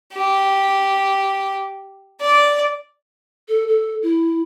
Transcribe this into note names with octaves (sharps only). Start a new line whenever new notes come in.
G4
D5
A4
A4
E4